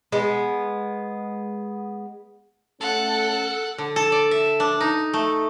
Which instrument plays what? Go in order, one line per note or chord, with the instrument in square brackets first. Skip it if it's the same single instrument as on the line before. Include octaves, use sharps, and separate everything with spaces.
[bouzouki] G#3 B3
[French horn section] A3 C#4 [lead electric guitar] A4 [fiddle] F#5
[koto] D3
A4
D5
E5
D4
D#4
A3